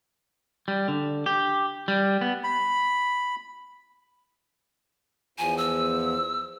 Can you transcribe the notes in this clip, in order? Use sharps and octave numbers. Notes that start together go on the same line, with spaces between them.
G3
D3
G4
G3
B3
B5
E2 F3 G#5
E6